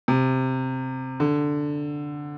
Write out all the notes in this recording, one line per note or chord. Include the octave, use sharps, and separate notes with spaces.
C3
D3